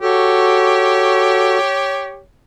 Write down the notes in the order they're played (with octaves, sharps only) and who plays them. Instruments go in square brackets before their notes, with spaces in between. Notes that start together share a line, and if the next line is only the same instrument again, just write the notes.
[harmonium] F#4 A4 [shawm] G4 [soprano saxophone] C#5